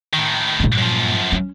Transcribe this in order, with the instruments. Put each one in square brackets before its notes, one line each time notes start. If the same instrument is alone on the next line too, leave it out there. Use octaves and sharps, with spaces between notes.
[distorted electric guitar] A2 D#3
[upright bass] G2 A#2
[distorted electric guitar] F#2 F3
[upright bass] C#4